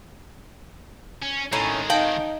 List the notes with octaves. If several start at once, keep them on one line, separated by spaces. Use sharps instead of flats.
C#4
A2 D#3 G#3 C#4 D#4
D#4 F5 G5 A5